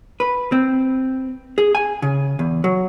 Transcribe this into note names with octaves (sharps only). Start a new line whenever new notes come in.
B4
C4
G#4
G#5
C#3
E2
F#3